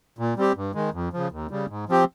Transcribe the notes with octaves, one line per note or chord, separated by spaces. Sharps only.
A#2
G3 C4 G4
G2
D#3 G#3
F2
C#3 F3
D#2
C#3 G3
G#2
F3 C4 G4